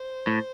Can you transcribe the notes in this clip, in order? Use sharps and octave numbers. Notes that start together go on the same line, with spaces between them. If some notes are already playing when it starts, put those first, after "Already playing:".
Already playing: C5
A2